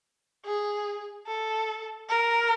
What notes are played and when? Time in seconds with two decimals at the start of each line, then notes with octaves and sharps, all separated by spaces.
0.45 G#4
1.27 A4
2.09 A#4